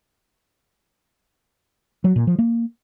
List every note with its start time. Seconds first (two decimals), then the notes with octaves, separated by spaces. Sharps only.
2.04 F#3
2.16 A#2
2.27 F3
2.39 A#3